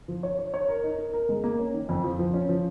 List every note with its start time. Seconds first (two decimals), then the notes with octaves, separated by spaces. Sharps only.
0.08 F3
0.23 C#5
0.39 C#5
0.54 C#5
0.69 A#4
0.83 D#4
0.99 A#4
1.14 A#4
1.29 G#3
1.44 A#3
1.59 C#4
1.74 D#3
1.89 F2
2.04 F3
2.19 F3
2.34 C#4
2.49 F3